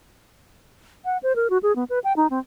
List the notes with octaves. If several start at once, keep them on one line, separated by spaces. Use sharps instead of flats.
F#5
C5
A#4
F#4
G#4
B3
B4
G5
D#4
C4